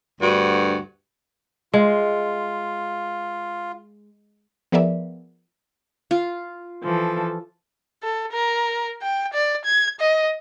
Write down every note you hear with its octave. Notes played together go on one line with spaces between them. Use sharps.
D2 G2 F#4
G#3 F4
F3 B3 G#4 A#4 D5 E5
F4
E3 F3 A4
A4
A#4
G5
D5
G#6
D#5